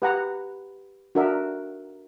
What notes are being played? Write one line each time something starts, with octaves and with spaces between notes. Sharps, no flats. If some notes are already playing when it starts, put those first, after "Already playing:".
G4 B4 F#5 A#5
D4 F#4 A#4 E5